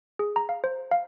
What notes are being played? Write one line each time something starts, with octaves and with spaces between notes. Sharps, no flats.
G#4
A#5
F5
C5
F5